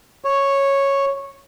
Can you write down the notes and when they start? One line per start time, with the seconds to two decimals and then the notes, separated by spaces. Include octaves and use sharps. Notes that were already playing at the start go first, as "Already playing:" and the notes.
0.24 C#5